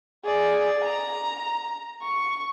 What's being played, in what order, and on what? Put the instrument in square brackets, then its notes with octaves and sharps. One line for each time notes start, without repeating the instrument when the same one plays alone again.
[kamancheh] G#4 D5
A#5
C#6